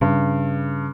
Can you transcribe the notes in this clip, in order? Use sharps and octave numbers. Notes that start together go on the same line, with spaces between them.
G2 C#3